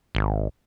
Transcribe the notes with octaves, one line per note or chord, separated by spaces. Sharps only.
G#1